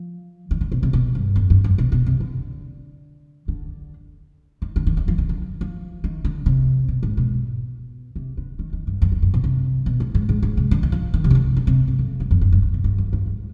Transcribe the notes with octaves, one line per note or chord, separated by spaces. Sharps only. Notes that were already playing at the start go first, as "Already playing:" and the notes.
Already playing: F3
D#3
D3
B2
C3
B2
G2
F2
G2
G2
B2
B2
C3
D3
D3
D#3
D3
D#3
D#3
F3
D#3
D3
F3
D#3
D3
C3
B2
G#2
B2
C3
D3
D#3
D#3
G2
F2
F2
G2
B2
C3
B2
G#2
G#2
G#2
G#2
C3
D3
D#3
F3
D#3
C3
D#3
D3
D3
C3
G#2
F2
G2
F2
G2
G2
G#2
B2
G2
F2
G2
G#2